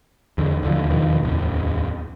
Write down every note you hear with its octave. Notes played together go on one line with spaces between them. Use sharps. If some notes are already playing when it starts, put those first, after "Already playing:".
E2 D3
D#2 D3 F3
E2 B2 D#3 F3
D1 E2